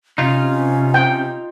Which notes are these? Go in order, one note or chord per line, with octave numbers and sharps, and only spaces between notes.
C3 C#4 D#4 F4
G5